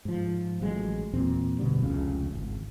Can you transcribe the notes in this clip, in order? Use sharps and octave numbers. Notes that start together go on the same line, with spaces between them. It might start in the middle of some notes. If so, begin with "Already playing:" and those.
G#2 F3
A1 F#3 G#3
E2 A#2 C4
G1 B2 D3 G3
F1 C#2 C#3
G#1